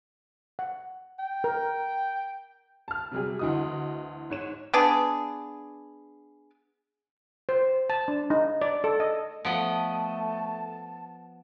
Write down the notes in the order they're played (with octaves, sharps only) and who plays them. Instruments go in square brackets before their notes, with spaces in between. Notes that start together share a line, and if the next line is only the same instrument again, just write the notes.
[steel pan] F#5
[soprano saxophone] G5
[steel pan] A#4
[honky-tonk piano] A5 F6
C3 F#3 G3 G#4
D2 E3 F#4 D#5 D#6
G#2 C#5 E7
[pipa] B3 D4 G#4
[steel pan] C5
A5
D4
D#4
D5
A4
D#5
[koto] F3 B3 D#5 [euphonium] A3 [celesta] F#5 D7 [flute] A5